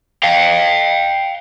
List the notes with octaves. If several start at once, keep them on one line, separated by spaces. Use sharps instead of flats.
F5 G5